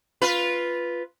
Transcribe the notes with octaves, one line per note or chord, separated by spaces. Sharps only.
F4 B4